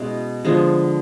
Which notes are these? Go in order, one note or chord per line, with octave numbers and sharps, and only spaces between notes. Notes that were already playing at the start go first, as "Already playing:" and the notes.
Already playing: B2 G#3 C#4 E4
D3 F3 G#3 B3